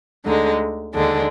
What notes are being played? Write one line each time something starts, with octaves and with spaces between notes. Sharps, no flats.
D2 D3 G#3 D#4
D#2 D3 G#3 D4